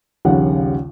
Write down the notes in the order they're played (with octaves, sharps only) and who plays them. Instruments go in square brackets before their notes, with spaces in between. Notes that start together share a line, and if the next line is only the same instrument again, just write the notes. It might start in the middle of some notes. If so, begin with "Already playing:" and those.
[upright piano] A#1 D#2 C#3 G3 F#5